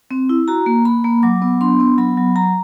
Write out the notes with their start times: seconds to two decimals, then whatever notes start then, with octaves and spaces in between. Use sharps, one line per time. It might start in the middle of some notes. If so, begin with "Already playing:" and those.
0.11 C4
0.29 E4
0.48 F#4 A#5
0.66 A#3
0.85 A#3 B5
1.04 A#3
1.23 F#3 D6
1.42 B3
1.61 D4 C6
1.80 B3
1.98 F#3 B5
2.17 F#3
2.36 F#3 A#5